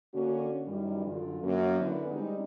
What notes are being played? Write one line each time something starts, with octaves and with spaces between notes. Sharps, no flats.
D3 A#3 C#4 F#4
F#2 D#3 E3 G3
F#2 D3 F4
F#2 F#3 A#3
D3 E3 B3
G3 G#3 C4 C#4 D#4